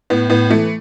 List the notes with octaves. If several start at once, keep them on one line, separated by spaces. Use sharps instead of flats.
A2 B3
A2 B3
E3 A3